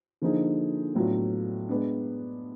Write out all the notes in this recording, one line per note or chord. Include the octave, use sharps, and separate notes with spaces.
D3 F3 A#3 D#4 G#4
A2 F#3 B3 D4 F4
G#3 B3 D4